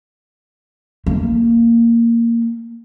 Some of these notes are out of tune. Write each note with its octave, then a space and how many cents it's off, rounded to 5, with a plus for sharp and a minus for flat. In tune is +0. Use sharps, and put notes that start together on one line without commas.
A#3 -10